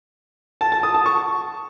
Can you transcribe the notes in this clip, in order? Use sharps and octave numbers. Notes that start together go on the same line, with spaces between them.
A5
A5
D#6
A5
C#6